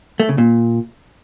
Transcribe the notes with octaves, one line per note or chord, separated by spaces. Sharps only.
A3
C#3
A#2